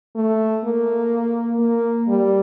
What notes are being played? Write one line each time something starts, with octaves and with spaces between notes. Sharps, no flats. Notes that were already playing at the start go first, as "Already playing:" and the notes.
A3
A#3
A#3
G3